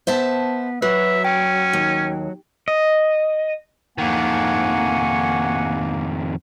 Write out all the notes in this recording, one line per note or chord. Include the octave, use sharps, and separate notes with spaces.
B3 C5 E5 A5
F#3 F#4 B4 E5
C#4 G5
D#2
D#5
F2 D#3 A#3 F#5 G#5 C#6